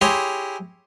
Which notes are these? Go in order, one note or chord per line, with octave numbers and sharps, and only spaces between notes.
E4 G4 G#4 C#5 A#5 C6